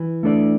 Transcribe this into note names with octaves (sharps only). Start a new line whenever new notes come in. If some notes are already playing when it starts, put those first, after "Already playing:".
Already playing: E3
A3 D4 A4 D5